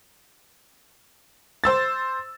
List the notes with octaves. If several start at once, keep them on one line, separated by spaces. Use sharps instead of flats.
C5 E6 A6